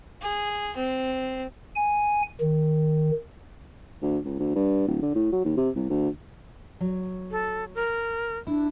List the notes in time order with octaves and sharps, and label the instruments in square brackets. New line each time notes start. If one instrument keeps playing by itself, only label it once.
[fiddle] G#4
C4
[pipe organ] G#5
D#3
[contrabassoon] D2
C#2
D2
G2
D1
D3
A2
F#3
D#2
C3
C2
D2
[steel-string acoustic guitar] F#3
[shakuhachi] A4
A#4
[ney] D4 [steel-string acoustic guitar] E4